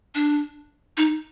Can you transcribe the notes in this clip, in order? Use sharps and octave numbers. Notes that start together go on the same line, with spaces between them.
D4
D#4